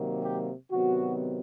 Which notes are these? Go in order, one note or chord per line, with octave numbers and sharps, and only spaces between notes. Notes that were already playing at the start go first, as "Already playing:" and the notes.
Already playing: C3 D#3 F#3 A#3
G4
C3 D#3 F#3 B3 F#4